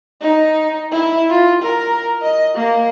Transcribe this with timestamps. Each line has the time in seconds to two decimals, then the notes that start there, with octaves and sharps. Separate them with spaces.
0.22 D#4
0.92 E4
1.30 F4
1.62 A#4
2.22 D#5
2.55 A#3